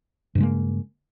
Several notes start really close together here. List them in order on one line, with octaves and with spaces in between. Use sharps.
G2 C#3 G#3 A#3